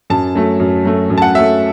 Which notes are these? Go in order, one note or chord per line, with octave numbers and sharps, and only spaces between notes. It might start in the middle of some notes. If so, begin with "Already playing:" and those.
F#2 A5
F#3 A3
F#2
F#3 A3
F#2
A5
F#5
F#3 A3 E5